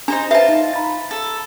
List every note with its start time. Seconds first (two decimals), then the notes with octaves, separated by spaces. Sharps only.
0.08 D4 D#4 C5 A#5
0.31 F4 B4 C5 E5 A5
0.48 D#4
0.74 A#5 B5 A6
1.11 A4